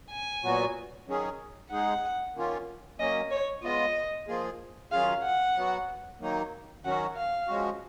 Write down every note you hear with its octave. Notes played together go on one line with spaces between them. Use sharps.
G#5
A#2 F#3 B3 F#4
D#3 F#3 C#4 G#4
G#3 D#4 G#4 F#5
D#3 A#3 C#4 F4
F#3 A#3 C#4 D#5
C#5
G#3 B3 F4 D#5
F3 A#3 F4 G#4
D#3 F#3 C#4 F4 G#4 F5
F#5
F#3 B3 F#4
D#3 F#3 A#3 D#4
D#3 F#3 C#4 F#4 F#5
F5
F3 G#3 C#4 F#4